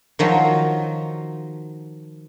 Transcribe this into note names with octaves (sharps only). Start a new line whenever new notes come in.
D#3 F3 F#3